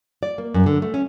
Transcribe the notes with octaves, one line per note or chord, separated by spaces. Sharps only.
D5
A#3
F#2
D3
A3
C#4